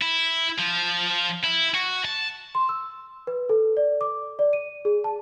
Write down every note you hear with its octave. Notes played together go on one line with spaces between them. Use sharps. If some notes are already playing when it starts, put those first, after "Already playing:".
E4
F3
E4
F#4
A5
C6
E6
B4
A4
D5
D6
D5
D#7
G#4
A5